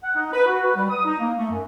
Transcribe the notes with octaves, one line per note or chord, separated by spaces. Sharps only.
F#5
D#4
B4
F#4
B4
G3
D#6
D#4
A#3
A3
F#2